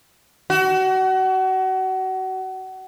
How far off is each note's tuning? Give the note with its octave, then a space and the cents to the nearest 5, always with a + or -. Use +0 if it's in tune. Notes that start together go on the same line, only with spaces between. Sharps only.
F#4 +30